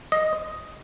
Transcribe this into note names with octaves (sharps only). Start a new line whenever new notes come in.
D#5